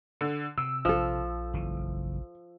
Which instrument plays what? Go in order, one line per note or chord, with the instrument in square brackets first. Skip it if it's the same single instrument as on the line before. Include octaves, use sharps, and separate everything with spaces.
[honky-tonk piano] D3
[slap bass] C3 [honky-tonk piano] E6
[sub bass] A#1 [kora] F3 A4
[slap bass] F#1 E3